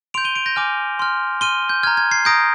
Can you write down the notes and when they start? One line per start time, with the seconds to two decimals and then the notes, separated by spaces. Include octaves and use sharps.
0.14 C6 G6 D7 F7
0.25 D#7 G7
0.36 D7 F7
0.46 G6 A#6
0.56 G#5 D6 F6
0.99 C6 F6
1.41 C6 F6 D#7 G7
1.69 G6
1.83 A#5 F6 G#6
1.97 G#6
2.11 G#6 C7
2.25 A#5 D#6 G6 A#6 D7